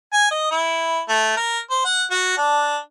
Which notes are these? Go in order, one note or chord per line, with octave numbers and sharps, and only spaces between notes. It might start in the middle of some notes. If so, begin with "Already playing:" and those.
G#5
D#5
E4
A3
A#4
C5
F#5
F#4
D4